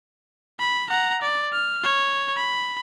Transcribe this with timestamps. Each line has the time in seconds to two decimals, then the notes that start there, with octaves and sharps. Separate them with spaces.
0.59 B5
0.89 F#5 A#5
1.22 D5
1.53 F6
1.84 C#5
2.36 B5